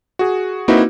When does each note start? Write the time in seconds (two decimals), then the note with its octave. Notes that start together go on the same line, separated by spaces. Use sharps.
0.19 F#4 G#4
0.68 A#3 C4 D#4 E4 F#4 B4